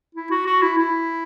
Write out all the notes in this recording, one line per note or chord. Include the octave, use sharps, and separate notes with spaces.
E4
F#4
F#4
E4
E4